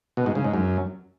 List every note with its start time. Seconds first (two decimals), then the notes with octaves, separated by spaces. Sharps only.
0.17 B2
0.26 G#2
0.35 C#3
0.44 G#2
0.54 F#2